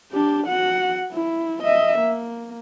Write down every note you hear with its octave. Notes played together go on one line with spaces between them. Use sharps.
D4 G4
F#4 F#5
E4
D#5 E5
A#3